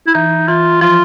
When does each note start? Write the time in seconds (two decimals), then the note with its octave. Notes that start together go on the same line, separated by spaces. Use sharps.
0.07 E4
0.14 E3 D#4
0.48 E3 F4
0.81 F3 F4